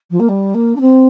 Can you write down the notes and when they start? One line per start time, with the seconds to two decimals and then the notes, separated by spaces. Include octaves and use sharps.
0.10 F3
0.19 A#3
0.28 G3
0.54 A#3
0.75 D4
0.80 C4